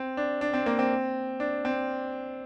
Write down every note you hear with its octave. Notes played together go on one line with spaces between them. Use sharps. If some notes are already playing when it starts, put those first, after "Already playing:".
Already playing: C4
D4
D4
C4
A#3
C4
D4
C4